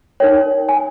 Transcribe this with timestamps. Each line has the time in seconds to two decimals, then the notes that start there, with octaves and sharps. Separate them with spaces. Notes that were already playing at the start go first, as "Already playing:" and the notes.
0.20 D#4 A#4 C#5 G5
0.69 G#5